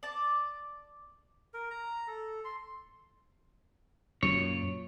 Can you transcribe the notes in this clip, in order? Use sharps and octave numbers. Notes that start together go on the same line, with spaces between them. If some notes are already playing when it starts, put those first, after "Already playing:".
D5 A5
A#4
A#5
A4
C6
F#2 A#2 C#3 C#5